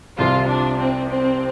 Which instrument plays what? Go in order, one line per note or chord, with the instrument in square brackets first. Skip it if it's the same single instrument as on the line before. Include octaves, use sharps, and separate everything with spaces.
[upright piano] C2 C3 F3 [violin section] F4
[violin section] D4
C4
C4